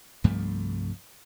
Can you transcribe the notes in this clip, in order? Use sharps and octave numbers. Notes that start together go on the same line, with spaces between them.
C2 G2 F3 A3